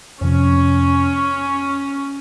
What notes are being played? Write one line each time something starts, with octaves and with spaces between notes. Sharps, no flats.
F2 C3 F3 C#4